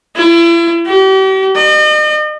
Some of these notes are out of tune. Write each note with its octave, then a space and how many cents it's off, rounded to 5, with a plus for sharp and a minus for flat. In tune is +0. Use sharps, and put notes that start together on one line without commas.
E4 +40
G4 -40
D#5 -40